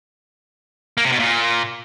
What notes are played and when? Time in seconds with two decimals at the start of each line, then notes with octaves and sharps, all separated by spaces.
0.98 A#3
1.05 C3
1.12 B2
1.20 A#2